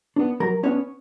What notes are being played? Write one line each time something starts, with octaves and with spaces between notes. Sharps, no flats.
B3 D4
F#3 A#4 A#5
B3 C#4 D4 C#5